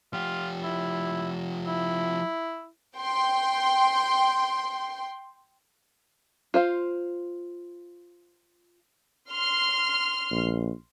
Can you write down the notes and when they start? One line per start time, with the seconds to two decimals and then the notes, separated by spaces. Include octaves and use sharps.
0.13 F3 F4 G4
0.63 E4
1.67 E4
2.97 G5 C6
6.54 F4 C5 F5
9.30 C6 F6
10.32 A#1